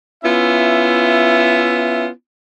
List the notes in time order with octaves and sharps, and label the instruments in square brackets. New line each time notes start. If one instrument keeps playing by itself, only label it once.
[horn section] B3 C#4 E4 F4 E5